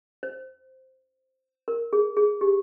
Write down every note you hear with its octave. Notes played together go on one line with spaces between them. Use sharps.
C5
A#4
G#4
G#4
G4